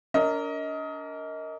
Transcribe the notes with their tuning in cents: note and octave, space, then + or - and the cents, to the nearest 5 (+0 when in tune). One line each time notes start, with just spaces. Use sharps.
D4 -40 A#4 -10 D#5 +25